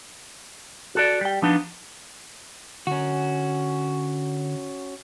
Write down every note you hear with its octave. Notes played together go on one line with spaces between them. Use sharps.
F#4 A4 D5
G3 G5
F3 B3 D4 D#4
D3 C#4 F#4